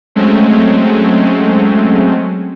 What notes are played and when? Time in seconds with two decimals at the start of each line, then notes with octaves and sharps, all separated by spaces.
0.15 F#3 G#3 A3 C4 C#4